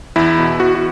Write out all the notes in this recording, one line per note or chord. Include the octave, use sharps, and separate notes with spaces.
E2 E4
B2
E2 F#4
F#4